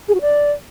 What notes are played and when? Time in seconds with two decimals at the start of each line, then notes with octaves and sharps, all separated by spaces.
0.08 G#4
0.15 F#4
0.21 D5